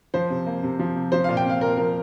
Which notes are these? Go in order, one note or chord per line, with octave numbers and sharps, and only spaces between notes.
F3 C5
C3
A#3
C3
F3
C3
F3 C5
F5
A#2
G5
C4 F5
A#2 A#4
F3 A#4